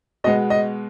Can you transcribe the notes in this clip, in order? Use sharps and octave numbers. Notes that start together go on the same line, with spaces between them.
B2 G#3 B3 D#5
D#5